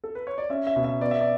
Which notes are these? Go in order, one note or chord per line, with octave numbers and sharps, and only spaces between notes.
A4
B4
C#5
D5
C#4 E5
E5
B2
E5
B3 D5
E5
D5